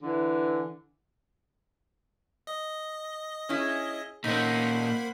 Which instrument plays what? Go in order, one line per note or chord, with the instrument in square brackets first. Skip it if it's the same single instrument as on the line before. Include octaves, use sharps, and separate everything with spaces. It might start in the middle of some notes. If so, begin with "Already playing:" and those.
[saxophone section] D3 E3
[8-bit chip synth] D#5
[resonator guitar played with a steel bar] C#4 E4 [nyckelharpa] G#4
[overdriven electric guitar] A#2 C#4 [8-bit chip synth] A#3 B5 [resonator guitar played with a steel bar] C4 D#4 [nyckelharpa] C5 F#5